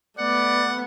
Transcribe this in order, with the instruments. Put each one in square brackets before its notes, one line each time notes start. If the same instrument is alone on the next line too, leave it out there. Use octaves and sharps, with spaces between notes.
[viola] A3 B3 [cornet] D5 [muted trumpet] F#5